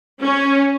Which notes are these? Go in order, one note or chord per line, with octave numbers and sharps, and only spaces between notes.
C#4